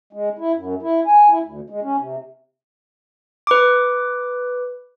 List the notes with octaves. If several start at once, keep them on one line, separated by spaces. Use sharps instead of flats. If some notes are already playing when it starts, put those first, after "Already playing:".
G#3
E4
F#2
E4
G#5
E4
D2
G#3
C#4
C3
B4 D6